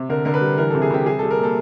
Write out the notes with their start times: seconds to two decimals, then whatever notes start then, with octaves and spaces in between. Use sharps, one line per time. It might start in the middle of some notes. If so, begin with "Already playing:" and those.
Already playing: C3
0.09 D3 A#4
0.25 D3 A#4
0.34 B4
0.41 G3
0.58 E3 A#4
0.70 C3 A4
0.82 G#4
0.91 C3 G4
1.06 G3 G#4
1.19 G3 A4
1.31 A#4
1.39 A#2 A4